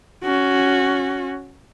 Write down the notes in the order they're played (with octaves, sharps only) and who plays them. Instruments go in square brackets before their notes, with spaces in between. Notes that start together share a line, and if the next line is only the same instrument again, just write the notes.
[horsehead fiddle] C#4 F#4